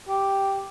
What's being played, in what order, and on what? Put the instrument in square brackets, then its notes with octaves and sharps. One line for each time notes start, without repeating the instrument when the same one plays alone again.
[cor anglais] G4